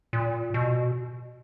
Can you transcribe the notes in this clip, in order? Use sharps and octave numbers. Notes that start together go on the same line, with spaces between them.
A#2
B2